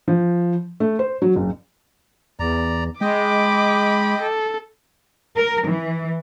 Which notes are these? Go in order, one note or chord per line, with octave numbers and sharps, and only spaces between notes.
F3
A3
C5
F#3
F#1
E2 D5 A#5
G#3 D#5 G5 B5 D6
A4
A#4
E3